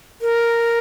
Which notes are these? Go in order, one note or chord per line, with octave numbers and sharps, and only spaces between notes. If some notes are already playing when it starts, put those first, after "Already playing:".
A#4